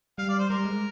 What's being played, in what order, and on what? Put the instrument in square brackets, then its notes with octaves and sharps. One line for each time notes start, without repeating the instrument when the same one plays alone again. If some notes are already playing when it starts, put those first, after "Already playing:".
[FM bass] G3 [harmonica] F5
[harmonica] D5
C5
[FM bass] G3 [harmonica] A#4
[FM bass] G#3